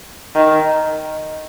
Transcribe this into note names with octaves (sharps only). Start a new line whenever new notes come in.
D#3